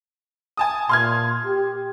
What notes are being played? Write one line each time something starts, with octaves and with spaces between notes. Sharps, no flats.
G#5 A5 D#6
A#2 C6 F6 G#6
G4